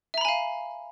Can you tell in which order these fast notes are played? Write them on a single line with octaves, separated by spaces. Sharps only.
E5 A#5 B5 G#5 F5